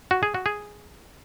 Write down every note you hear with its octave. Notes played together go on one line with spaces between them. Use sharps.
F#4
G#4
F#4
G#4